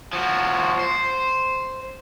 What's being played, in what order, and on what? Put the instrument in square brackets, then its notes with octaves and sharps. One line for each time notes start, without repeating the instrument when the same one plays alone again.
[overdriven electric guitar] F3 F#4
C5